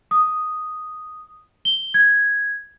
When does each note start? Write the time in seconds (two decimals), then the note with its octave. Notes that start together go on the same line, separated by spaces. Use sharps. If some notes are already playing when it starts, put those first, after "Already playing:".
0.11 D#6
1.65 G7
1.94 G#6